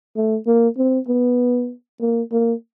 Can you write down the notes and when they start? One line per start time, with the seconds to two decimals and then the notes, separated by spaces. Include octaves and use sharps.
0.16 A3
0.47 A#3
0.78 C4
1.08 B3
2.01 A#3
2.32 A#3